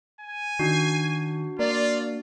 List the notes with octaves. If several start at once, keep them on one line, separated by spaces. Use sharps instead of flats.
G#5
D#3 D4 F#4
A#3 F4 D5